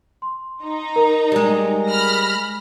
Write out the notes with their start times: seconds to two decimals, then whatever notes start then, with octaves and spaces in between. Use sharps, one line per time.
0.22 C6
0.63 D#4 A#5
0.96 A#4
1.32 G3 G#3
1.87 B5 F6 A#6